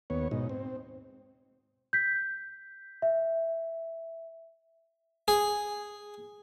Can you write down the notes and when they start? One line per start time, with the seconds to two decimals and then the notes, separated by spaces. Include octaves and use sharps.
0.10 D#2 B3 C#5
0.31 G#2 B2 D#4
0.49 C4
1.93 G6 B6
3.02 E5
5.28 G#4